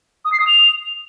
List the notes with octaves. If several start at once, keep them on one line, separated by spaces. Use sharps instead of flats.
D#6
C7
D#6
F7